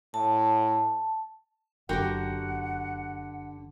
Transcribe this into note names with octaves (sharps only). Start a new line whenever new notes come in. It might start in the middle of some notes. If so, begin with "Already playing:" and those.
A2 A5
F#1 D3 F#4 G4 A#4 F#5 G5